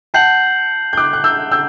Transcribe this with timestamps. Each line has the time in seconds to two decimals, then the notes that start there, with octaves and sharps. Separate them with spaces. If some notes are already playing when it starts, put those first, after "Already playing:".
0.14 F#5 A5 G6 C7 F#7
0.93 G6
0.97 D6 F#6
1.13 F#6
1.24 E6 G6
1.52 E6 G6